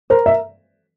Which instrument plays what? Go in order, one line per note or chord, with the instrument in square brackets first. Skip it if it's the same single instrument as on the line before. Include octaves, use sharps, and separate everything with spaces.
[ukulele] A#4 [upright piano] C5
[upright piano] E5